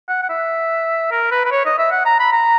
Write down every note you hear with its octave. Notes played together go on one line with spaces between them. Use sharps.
F#5
F#5
E5
A#4
B4
B4
C#5
D#5
E5
F#5
A#5
B5
A#5